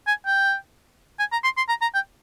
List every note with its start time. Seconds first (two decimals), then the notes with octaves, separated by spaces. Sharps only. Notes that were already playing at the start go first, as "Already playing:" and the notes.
0.08 G#5
0.26 G5
1.19 G#5
1.32 A#5
1.44 C6
1.57 C6
1.69 A#5
1.82 A#5
1.94 G5